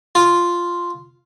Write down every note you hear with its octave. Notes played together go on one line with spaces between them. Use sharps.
F4